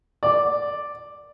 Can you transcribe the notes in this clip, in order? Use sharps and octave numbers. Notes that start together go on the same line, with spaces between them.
D5